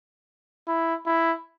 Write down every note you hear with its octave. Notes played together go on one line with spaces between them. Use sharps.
E4
E4